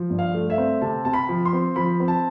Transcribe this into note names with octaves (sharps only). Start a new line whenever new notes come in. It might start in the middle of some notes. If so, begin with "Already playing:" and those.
Already playing: F3
G2
F5
A3
E5
C4
C3 A5
C3 A5
B5
F3
C6
C4
F3 B5
C4
A5